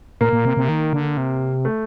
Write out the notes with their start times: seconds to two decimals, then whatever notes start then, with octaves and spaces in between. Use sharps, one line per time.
0.21 A#2 A#3
0.33 A#2
0.45 C3
0.57 C3
0.69 D#3
0.93 D3
1.17 C3
1.65 A3